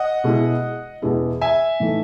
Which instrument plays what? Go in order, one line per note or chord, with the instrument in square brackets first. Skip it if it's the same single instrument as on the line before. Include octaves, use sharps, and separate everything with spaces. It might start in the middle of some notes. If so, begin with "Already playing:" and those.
Already playing: [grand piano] D#5 F#5
[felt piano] B2 G#3 B3 E4
E2 B2 G#3 B3 E4
[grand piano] E5 G#5
[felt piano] A2 E3 A3 D#4